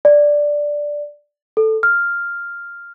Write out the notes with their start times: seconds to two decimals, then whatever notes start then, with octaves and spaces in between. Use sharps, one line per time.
0.05 D5
1.57 A4
1.83 F6